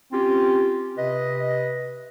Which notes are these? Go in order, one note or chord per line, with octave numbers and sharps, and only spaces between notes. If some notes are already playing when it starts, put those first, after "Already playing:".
C4 C#4 F4 G4
C3 B4 D#5